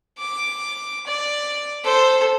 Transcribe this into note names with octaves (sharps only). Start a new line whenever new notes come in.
D6
D5
A4 C5